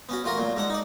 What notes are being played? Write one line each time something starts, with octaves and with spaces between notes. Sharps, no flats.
B3 C#4 F#4
A1 F4 F#4 A#4 A#5
A#2 F#3
G#2 D4 F#5
D#4 D5